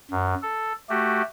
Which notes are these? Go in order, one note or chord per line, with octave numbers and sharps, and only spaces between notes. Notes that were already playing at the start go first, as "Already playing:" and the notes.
F#2
A4
A3 F#4 G4